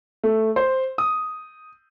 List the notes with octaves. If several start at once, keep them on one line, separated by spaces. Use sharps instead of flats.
A3
C5
D#6